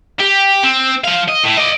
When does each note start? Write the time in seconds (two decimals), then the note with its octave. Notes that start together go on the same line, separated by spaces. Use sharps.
0.19 G4
0.63 C4
1.04 F3 F5
1.28 D#5
1.44 A2
1.57 D5 D#5